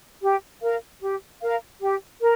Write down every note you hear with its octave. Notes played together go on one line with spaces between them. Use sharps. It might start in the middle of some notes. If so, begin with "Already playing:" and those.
G4
A#4 F5
G4
A#4 F5
G4
A#4